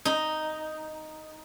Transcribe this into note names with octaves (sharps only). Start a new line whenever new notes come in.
D#4